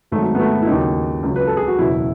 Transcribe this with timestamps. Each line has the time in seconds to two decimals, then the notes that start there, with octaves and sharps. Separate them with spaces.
0.12 G#1 G#2 F#3 A3
0.35 B3
0.40 A3
0.62 E4
0.67 D#2 C#3 F#3 D#4
1.23 C#2 C#3 F#3
1.36 B4
1.47 A4
1.57 G#4
1.68 F#4
1.78 F#1 E2 B2 F#3 E4